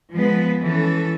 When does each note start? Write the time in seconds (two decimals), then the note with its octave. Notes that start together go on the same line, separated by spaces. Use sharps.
0.13 F3 G#3 B3 B4
0.63 E3 C#4 A4